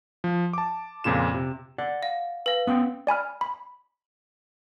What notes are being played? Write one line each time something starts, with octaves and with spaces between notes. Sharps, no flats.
F3
A5 D6
F2 A#2 C#3 F4 E7
C3
D5 F#5
F5
B4 F5
B3 C#4 G5
D5 G#5 B5 F6
B5